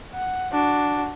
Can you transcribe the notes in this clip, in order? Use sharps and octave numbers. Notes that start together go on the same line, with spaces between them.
F#5
D4 F#4